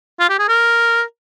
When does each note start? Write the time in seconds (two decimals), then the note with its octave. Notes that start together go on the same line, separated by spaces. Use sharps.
0.20 F4
0.29 G4
0.39 G#4
0.49 A#4